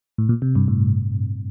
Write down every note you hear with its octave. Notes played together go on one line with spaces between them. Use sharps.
A2
A#2
C3
G2
A2